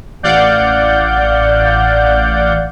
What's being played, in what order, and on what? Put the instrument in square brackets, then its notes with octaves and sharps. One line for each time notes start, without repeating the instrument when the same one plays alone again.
[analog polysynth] A1 D5 F5 F#5 G6